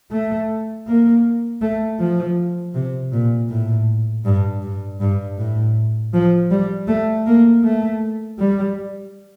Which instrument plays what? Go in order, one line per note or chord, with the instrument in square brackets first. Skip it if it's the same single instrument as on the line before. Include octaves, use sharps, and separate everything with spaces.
[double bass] A3
A#3
A3
F3
C3
A#2
A2
G2
G2
G2
A2
F3
G3
A3
A#3
A3
G3